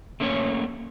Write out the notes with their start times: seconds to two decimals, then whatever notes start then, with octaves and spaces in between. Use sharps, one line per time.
0.20 A3 A#3 C#4 D4 C#5